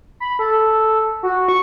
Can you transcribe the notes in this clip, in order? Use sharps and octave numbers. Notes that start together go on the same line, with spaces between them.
B5
A4
F#4
C#6